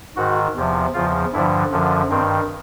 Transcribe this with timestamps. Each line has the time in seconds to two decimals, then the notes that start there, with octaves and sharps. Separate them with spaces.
0.16 G#2 D#3 F#4
0.56 E2 C3 F3
0.94 E2 C#3 F3 F4
1.33 G2 D3 F3 E4
1.72 F#2 D3 F3
2.09 G2 D#3 C4